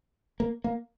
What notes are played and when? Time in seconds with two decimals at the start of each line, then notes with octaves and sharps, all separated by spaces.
0.40 A#3
0.64 A#3